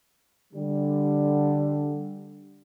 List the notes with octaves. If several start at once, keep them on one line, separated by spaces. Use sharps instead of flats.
D3 G3